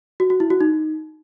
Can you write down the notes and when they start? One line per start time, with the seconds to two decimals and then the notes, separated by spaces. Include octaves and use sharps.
0.20 F#4
0.30 F#4
0.40 E4
0.50 F#4
0.61 D#4